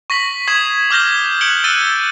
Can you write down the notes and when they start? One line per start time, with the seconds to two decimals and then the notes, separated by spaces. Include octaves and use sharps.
0.10 C#6 A#6 B6 F#7
0.48 C#6 D#6 G#6 C7 E7 F#7
0.90 D6 F6 G6 A#6 G7
1.41 F#6 G6 C#7 D7 F#7 G7
1.64 E6 F#6 A6 D#7 F#7 G7